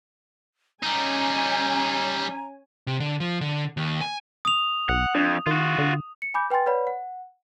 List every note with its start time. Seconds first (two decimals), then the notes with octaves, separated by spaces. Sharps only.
0.83 G3 C#4 D#4 G#5 A#5
2.87 C3
3.00 D3
3.20 F3
3.41 D3
3.77 D#2
4.01 G#5
4.45 D#6 F7
4.89 B1 F#5
5.15 F2 D4
5.47 D#3 F4 F#4
5.78 D3
6.22 C#7
6.34 G#5 B5 D6 G6
6.50 B4 G5 G#5 C6 A6
6.66 B4 C#5 D5 F#5 B5
6.87 F#5